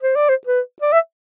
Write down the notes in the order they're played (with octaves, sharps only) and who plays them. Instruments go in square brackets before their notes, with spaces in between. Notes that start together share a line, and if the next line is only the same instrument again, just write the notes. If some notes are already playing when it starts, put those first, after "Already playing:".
[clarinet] C5
D5
C5
B4
D5
E5